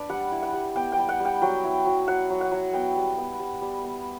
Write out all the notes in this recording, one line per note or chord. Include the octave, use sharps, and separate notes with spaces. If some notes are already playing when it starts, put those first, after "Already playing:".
Already playing: D4 B4 D5
G3 F#5
E4
F#5
G3
B3 G5
G5
G3
F#5
G3
G5
F#3 G5
E4
F#3
F#3 F#5
F#3
F#5
F#3
B3 G5
G3
B3
G3
G3
B3